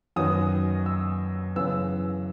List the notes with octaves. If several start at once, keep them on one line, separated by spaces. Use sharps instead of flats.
F#2 D#3 F#3 B3 D#6
E6
F#2 C#3 E3 B3 E6